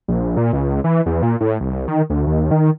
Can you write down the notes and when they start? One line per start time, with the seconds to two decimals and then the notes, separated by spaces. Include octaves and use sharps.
0.08 A#1
0.37 A#2
0.53 C#2
0.84 E3
1.06 E2
1.22 A#2
1.41 A2
1.60 C2
1.88 D#3
2.10 D2
2.27 D#2
2.51 D#3